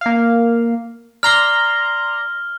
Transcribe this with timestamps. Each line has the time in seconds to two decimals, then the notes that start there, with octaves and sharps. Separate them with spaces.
0.01 A#3 F5
1.23 D5 A#5 C6 F6 G7